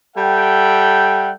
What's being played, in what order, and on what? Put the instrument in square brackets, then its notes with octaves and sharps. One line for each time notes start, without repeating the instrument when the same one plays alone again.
[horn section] G3 A4 E5 F#5 G5